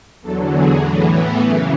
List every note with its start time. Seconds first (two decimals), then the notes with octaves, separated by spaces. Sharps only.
0.22 E2 D3 F#3 A4
0.52 G#4
0.82 A2 E3
1.12 B3
1.42 F#2 C#3 E3